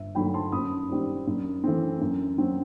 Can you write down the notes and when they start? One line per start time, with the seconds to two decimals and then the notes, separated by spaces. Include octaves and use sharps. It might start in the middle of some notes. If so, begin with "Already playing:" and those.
Already playing: G1 E5
0.15 G2 D#3 F#3 A3 G5 B5
0.34 A5 C6
0.52 F#2 B5 D#6
0.89 D#3 G3 C4
1.27 F#2
1.64 E3 A3 C4
2.01 F#2
2.38 F#3 C4